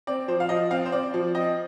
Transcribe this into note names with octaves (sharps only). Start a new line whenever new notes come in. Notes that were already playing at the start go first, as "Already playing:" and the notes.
C4 D5
F3 C5
F5
F3 D#5
C4 F5
C5
C4 D5
F3
C4 D#5